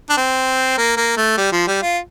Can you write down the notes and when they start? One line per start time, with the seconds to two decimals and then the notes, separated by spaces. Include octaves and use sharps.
0.10 D4
0.17 C4
0.77 A#3
0.97 A#3
1.17 A3
1.38 G3
1.52 F3
1.67 G3
1.82 F4